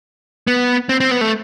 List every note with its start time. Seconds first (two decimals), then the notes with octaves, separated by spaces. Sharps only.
0.47 B3
0.89 C4
1.00 C4
1.11 B3
1.21 A3